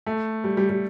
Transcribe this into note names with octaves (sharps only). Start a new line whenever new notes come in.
A3
G3
G3
G3